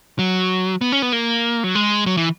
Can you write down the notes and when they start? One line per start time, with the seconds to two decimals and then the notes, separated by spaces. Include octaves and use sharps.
0.19 F#3
0.81 B3
0.92 C#4
1.02 B3
1.12 A#3
1.64 F#3
1.75 G#3
2.06 F#3
2.17 E3